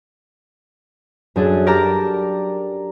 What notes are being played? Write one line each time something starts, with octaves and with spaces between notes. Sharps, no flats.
F#2 D4 G#4 A4
G4 A#4 D5 A5 A#5 D6